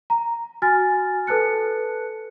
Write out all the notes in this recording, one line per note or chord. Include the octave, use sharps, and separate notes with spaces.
A#5
F#4 G#5 F6 A6
A4 B4 A5 F#6 C#7